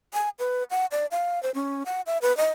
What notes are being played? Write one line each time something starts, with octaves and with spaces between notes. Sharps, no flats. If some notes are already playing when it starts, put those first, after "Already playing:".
G#5
B4
F#5
D5
F5
C5
C#4
F#5
E5
B4
D#5